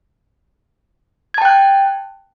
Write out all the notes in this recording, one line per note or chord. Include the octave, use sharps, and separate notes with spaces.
G5 A5 F#6 G#6